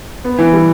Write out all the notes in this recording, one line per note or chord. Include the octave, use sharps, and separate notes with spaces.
B3
E3
G3